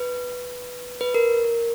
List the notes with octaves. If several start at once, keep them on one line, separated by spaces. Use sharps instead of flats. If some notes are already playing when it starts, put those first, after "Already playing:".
Already playing: B4
B4
A#4